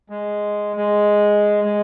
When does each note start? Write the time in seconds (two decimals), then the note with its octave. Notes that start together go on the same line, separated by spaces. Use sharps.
0.09 G#3
0.76 G#3
1.64 G#3